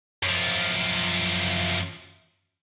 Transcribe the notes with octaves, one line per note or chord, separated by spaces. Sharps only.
F#2 F3